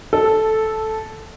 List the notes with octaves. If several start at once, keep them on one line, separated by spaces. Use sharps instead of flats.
A4